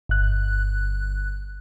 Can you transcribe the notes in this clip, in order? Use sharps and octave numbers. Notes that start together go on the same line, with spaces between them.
G1 F#6